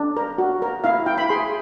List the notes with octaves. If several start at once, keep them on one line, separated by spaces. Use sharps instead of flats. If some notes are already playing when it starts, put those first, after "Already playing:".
Already playing: D4
A#4
F#4
A#4
E4 F5
E4 G5
B5
G#4 C6